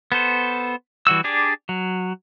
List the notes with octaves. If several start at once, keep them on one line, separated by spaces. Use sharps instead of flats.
B3 A4 C5
E3 G3 F#4 E6
D4 G4 G#4 D5
F#3